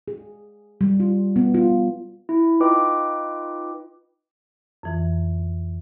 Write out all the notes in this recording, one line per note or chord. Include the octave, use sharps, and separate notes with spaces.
G#4
G3
F4
B3
F4
E4
D#4 F4 B4 D#5 G5 D6
F2 E3